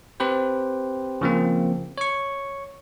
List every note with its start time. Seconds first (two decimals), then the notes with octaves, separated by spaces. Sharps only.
0.20 C4 G4 B4 C5
1.21 C#3 F3 A#3 C4
1.98 C#5 C#6